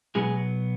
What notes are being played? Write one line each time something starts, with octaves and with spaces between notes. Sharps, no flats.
B2 F#3 G#3 B3 G#4